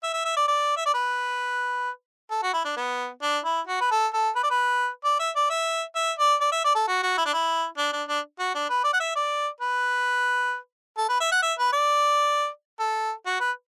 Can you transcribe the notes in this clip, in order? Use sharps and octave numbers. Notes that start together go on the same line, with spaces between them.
E5
E5
E5
D5
D5
E5
D5
B4
A4
F#4
E4
D4
B3
D4
E4
F#4
B4
A4
A4
B4
D5
B4
D5
E5
D5
E5
E5
D5
D5
E5
D5
A4
F#4
F#4
E4
D4
E4
D4
D4
D4
F#4
D4
B4
D5
F#5
E5
D5
B4
A4
B4
E5
F#5
E5
B4
D5
A4
F#4
B4